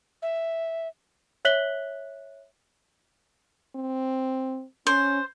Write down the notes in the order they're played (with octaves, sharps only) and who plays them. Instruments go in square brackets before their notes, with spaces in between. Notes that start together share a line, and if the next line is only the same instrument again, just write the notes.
[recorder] E5
[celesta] C#5 E5 F#6 B6 F#7 G7
[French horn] C4
[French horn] C#4 [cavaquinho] C5